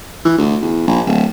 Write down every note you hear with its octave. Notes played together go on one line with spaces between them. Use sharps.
E3
D2
E2
A#1
D1